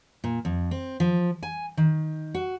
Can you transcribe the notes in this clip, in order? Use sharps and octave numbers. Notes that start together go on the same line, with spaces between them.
A#2
F2
C4
F3
G#5
D#3
F#4